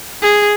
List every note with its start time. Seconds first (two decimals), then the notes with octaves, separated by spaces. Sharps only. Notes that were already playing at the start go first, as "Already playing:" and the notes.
0.22 G#4